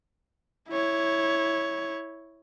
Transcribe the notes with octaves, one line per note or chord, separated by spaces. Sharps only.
E4 C#5